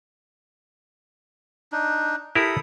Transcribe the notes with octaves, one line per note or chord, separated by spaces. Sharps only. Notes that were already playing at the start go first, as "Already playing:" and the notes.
D4 D#4
E4 G4 A4 A#4 B5 D#6